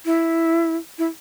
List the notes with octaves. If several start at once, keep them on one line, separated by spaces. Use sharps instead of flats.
E4
E4